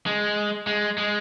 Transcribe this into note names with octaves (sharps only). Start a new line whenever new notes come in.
G#3
G#3
G#3